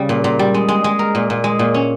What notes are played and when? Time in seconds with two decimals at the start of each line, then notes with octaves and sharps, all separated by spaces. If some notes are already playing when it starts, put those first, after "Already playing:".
Already playing: C#3 G3 C#4
0.09 A#2
0.24 A#2
0.39 G3
0.54 G#3
0.68 G#3
0.84 G#3
0.99 A#4
1.15 A#2
1.30 A#2
1.44 G#3
1.59 A#2
1.74 C#4